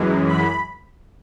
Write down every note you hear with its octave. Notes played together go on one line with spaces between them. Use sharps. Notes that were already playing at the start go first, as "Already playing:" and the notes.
Already playing: F#2 E3 G#3
B5